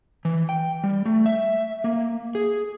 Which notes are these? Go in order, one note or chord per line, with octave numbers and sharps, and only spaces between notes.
E3
G5
G3
A3
E5
A#3
G#4